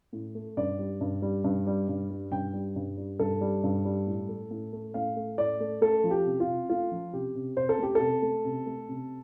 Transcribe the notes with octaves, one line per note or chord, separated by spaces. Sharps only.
A2
A3
G2 D5
G3
G2
G3
G2
G3
G2
G3
G2 G5
G3
G2
G3
G2 A4
G3
G2
G3
A2
A3
A2
A3
A2 F5
A3
A2 D5
A3
A3 A4
F3
G4
C3
F4
C3
A3 F4
F3
C3 G4
C3
C3 C5
A4
A3 G4
A4
C3
A3
C3
A3
C3